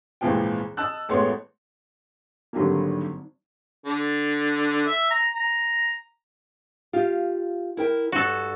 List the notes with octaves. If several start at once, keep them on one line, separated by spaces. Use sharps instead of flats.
G#1 C#2 A#2 E3 F3 G5
D#5 A5 E6 F#6
A1 G#3 A3 B3 C#5 C6
G#1 D3 F#3 G3 A#3
D3
E5
A#5
A#5
F4 G4 F5
E4 A#4 G5
G2 F#4 A4